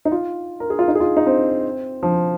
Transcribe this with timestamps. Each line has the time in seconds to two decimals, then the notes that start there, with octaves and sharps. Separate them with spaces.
0.05 D#4
0.12 F4
0.60 A#4
0.70 G#4
0.79 F4
0.88 D#4
0.95 G#4
1.00 F4
1.17 D#4
1.27 C4
2.03 F3